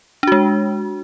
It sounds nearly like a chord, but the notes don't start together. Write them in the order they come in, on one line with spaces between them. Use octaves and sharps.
D4 F#4 G#3